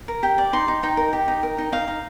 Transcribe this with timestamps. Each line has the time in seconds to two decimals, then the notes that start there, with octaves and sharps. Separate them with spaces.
0.08 A#4
0.23 G4 G5
0.38 D5
0.53 D#4 C6
0.68 D#4
0.83 D#4 G5
0.97 A#4
1.13 G4
1.28 D#4
1.43 A#4
1.58 D#4
1.72 D#4 F5
1.88 D#4